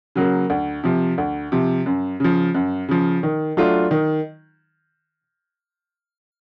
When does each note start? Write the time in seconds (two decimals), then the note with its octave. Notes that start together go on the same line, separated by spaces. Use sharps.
0.15 C#3 F#3 A#3
0.50 D2
0.83 C3 F3
1.18 D2
1.52 C3 F3
1.86 F#2
2.20 C#3 F3
2.55 F#2
2.89 C#3 F3
3.23 D#3
3.57 F#3 A3 D4 F4
3.91 D#3